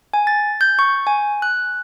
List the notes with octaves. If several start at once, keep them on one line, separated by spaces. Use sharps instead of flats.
G#5
A6
G6
C#6
G#5
F#6